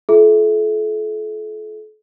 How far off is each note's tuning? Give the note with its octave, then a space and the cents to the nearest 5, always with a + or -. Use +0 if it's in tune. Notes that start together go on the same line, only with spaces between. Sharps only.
F4 -20 A4 -40 E5 -5